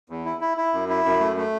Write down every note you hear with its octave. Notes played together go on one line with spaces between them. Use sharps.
E2
E4
E4
E4
F#2
E4
F#2
A3
A3